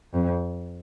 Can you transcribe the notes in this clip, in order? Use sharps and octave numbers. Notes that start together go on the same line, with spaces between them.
F2